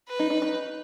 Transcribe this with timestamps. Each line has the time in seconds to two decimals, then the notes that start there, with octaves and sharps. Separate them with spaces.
0.08 B4
0.19 D#4
0.30 D#4
0.42 D#4